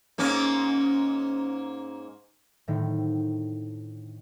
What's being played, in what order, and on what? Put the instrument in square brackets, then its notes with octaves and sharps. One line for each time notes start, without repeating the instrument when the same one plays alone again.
[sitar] G#2 A#3 C#4
[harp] A2 D3 D#3 C4